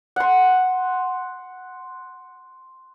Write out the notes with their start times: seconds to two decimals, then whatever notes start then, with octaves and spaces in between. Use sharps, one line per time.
0.16 F#5 C6